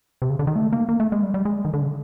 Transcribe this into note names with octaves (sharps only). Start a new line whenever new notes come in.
C3
C#3
D3
D#3
A3
A#3
A#3
A3
G#3
G3
G3
G#3
D#3
D3
C#3